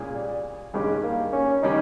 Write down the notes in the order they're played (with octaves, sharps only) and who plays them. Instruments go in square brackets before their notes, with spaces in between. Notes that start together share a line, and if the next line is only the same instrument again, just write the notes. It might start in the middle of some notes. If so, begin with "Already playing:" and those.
Already playing: [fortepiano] A#2 G#3 C#4 G#4
[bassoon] G3
[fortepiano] G2 D#3 G3 C#4 G4 [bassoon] G#3
[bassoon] A#3
C#4
[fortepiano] D#3 G3 C#4 G4 [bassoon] D#4